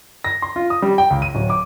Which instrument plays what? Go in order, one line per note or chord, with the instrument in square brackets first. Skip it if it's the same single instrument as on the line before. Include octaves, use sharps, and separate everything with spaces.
[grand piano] A#6
C6
F4
D#6
G3
G5
C#2
D#7
D1
D6